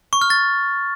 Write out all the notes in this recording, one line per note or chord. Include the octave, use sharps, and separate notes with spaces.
C#6
F6
A6